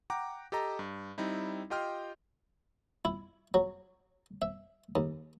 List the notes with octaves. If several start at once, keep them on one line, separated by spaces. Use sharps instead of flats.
F#5 G5 A#5 D6
G4 A4 D#5 A#5
G2
G3 C4 D#4 E4
F4 G4 D#5 G5 C6 F6
E4
F#3
E5
D#2